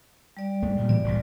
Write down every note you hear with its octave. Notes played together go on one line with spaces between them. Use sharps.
G3 D5
G2 G#3 A3
G2 A#2 C#3
A2 E3 G3 D5
E1 C2 A#2